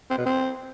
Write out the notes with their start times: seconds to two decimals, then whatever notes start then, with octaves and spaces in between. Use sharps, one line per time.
0.10 C4
0.18 B2
0.26 C4